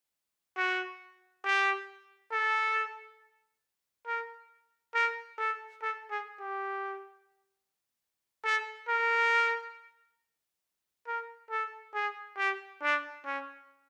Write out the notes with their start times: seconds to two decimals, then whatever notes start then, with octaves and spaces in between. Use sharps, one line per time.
0.57 F#4
1.45 G4
2.32 A4
4.07 A#4
4.94 A#4
5.38 A4
5.82 A4
6.11 G#4
6.40 G4
8.44 A4
8.88 A#4
11.07 A#4
11.51 A4
11.94 G#4
12.38 G4
12.82 D4
13.26 C#4